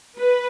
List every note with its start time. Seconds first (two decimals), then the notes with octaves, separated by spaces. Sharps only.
0.18 B4